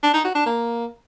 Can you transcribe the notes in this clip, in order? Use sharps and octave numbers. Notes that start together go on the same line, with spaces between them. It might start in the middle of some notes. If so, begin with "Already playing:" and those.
D4
D#4
F#4
D4
A#3